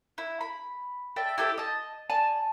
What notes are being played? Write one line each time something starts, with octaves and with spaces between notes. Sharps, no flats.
E4
B5
D5 E5 G5 A5
E4 G4 A4 C5
D#5 A5
D5 G#5 A5